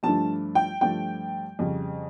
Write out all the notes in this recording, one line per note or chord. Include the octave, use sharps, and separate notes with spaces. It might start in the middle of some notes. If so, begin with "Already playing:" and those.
G2 F3 A3 D4 A5
G5
G2 F3 A3 D4 G5
F2 C#3 G3